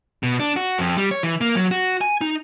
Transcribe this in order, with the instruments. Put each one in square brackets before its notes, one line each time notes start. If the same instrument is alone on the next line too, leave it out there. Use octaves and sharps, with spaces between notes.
[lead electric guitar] B2
D4
F#4
F2
G3
C#5
E3
A#3
F#3
F#4
G#5
D#4